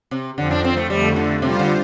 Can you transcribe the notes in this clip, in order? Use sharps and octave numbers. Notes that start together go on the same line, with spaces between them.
C3
F2 D3 F3 C4
D4
C4
A3
F2 D3 G3 A3
D3
C3 G3 F4 C5
D3